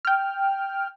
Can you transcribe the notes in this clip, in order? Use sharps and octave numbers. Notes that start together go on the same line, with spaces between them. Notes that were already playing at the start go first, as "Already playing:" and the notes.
G5 F6